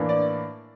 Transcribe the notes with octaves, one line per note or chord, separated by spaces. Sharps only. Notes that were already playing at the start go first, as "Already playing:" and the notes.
Already playing: A2 E3 A#3 D4
D5